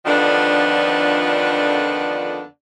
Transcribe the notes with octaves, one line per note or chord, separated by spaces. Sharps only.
F2 D3 D#3 F3 B3 D4